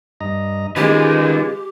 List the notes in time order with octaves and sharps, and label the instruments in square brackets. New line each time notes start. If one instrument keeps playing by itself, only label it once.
[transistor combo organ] G2 D#5 A#5
[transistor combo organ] D#3 C#4 [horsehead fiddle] G#3 [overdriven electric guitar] F4 B4 [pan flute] G4